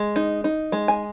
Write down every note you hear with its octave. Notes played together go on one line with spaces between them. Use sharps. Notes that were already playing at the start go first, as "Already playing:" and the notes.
Already playing: G#3
D#4
D#4
G#3
G#5